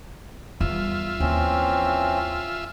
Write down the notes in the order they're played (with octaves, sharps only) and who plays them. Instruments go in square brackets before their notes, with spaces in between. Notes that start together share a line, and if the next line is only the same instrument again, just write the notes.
[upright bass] E2 G3 [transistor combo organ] F4 E5
[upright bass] D#2 [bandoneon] E3 C4 C#4